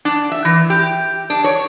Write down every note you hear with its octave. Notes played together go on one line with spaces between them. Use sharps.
D4
E5
E3
G4
D4
C#5